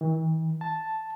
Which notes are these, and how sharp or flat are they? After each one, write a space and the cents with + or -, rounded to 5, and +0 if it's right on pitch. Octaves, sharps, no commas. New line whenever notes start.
E3 -45
A5 +0